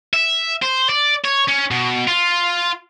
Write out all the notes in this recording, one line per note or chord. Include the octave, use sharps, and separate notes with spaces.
E5
C5
D5
C#5
C#4
B2
F4